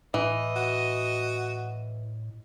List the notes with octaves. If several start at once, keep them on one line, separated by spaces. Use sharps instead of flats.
A2 E3 D#5
F#4